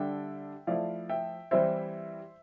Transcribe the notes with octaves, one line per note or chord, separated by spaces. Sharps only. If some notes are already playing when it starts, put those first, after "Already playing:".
Already playing: D3 G3 D4 E5 G5
F3 A3 E4 D5 F5
E5 G5
E3 G3 C4 E4 C5 E5